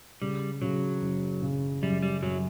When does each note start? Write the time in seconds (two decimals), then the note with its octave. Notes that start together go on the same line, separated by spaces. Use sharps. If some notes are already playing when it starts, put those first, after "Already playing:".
0.22 C#3 G3
0.62 C#3 F#3
1.02 F#1
1.42 C#3
1.82 F#2 G3
2.03 G3
2.22 F#2 F#3